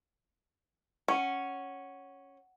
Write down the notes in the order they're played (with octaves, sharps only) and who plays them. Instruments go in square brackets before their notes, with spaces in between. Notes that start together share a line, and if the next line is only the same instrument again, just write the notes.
[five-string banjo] C#4 [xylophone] F#5